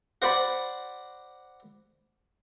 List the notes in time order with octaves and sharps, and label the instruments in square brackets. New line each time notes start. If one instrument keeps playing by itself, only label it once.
[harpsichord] F#4 C5 D5 F#5 B5